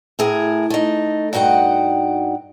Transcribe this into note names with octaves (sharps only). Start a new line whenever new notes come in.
A2 G#4 A#4 E5
A3 D#4
G2 D#4 F#4 F#5 G5